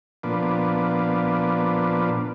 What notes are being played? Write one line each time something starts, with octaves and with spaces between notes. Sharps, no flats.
A#2 F3 B3 D4